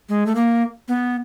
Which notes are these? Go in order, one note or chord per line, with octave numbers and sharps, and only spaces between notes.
G#3
A3
A#3
B3